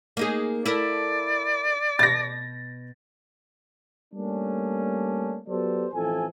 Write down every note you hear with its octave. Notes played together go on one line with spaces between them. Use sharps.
A#3 D#4 G#4
E4 A4 A#4 D5
B2 A6 A#6
G3 A3 A#3 C#4 D4
F#3 B3 G4 A4 C5 D5
A1 F2 E3 A4 G#5